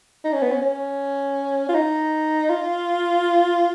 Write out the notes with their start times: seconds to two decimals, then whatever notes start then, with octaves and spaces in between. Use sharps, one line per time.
0.24 D#4
0.33 C#4
0.42 B3
0.52 C#4
0.62 C#4
1.69 F4
1.75 D#4
2.50 F4